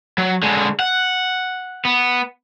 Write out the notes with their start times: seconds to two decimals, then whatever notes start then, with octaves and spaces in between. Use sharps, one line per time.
0.18 F#3
0.43 D3 G#3
0.79 F#5
1.85 B3